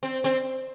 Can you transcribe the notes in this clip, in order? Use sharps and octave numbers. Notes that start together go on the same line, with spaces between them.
C4
C4